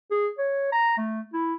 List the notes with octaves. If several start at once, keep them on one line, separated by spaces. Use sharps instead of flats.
G#4
C#5
A#5
A3
E4